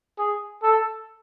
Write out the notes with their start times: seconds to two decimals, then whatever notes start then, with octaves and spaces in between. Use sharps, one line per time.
0.18 G#4
0.63 A4